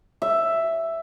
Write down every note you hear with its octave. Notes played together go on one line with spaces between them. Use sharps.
E5